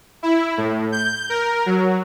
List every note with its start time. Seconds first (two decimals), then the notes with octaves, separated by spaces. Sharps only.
0.23 E4
0.58 A2
0.92 G6
1.30 A#4
1.66 F#3